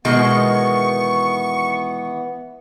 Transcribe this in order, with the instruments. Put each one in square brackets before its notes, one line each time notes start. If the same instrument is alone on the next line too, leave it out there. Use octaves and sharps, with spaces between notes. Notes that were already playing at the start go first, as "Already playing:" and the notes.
[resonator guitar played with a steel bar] B2 D#3 G#3 [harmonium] E3 B3 [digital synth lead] C#6